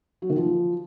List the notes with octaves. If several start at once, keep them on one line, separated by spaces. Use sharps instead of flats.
F#3
D#3
F3